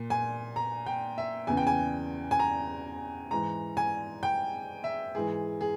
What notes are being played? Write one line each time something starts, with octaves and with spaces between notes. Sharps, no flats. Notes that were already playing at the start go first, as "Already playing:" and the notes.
Already playing: A#2
G#5
A#5
G5
E5
E2 C#3 E3 G#5
G5
G#5
G#5
A#5
G#2 E3 A#5
G#5
G5
E5
G#2 E3 G#4
G#4